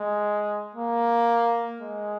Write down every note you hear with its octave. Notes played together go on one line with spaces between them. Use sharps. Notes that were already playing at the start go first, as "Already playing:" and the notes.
Already playing: G#3
A#3
G#3